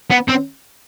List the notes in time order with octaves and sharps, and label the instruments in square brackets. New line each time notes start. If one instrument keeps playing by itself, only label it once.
[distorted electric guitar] B3
C4